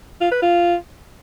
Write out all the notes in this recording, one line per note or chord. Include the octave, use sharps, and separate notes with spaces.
F4
B4
F4